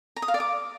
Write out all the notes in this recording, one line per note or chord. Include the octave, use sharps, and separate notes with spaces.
A#5
D#6
F5
D5
D6